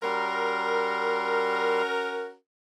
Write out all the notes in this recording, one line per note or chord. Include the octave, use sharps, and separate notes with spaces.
G3 C#4 F#4 A#4 C6